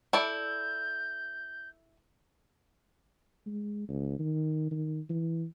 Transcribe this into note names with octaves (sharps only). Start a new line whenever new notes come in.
E4 A4 D5 G6
G#3
C#2
D#3
D#3
E3